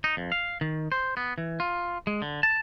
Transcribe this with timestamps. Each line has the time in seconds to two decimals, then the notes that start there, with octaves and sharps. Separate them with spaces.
0.04 D#4
0.17 F2
0.32 F5
0.61 D#3
0.92 C5
1.17 B3
1.38 E3
1.60 F4
2.07 G#3
2.22 D3
2.43 A5